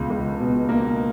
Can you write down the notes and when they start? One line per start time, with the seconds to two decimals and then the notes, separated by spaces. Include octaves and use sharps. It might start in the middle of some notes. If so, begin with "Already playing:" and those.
Already playing: C#2 B2
0.10 C#2
0.40 B2
0.69 A#3